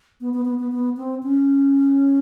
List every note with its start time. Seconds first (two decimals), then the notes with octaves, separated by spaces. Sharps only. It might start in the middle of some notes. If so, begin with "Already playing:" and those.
0.21 B3
0.34 B3
0.45 B3
0.59 B3
0.72 B3
0.97 C4
1.23 C#4